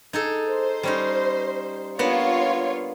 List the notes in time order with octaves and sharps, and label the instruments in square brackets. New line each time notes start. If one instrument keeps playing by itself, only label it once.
[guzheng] D#4 G#4 A4
[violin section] C5
[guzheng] G3 C#4 D#4
[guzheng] A#3 B3 D4 [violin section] F4 C#5